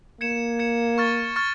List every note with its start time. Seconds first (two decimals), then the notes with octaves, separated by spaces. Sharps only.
0.21 A#3 G#6 C#7 E7
0.59 G#6 C#7 E7
0.98 C#6 F6 A6
1.36 C#6 F6 A6